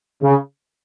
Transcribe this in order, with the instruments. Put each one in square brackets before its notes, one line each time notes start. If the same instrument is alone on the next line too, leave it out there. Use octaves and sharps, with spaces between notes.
[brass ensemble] C#3